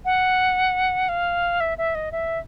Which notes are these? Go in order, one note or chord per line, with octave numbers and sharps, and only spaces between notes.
F#5
F5
E5
E5
D#5
E5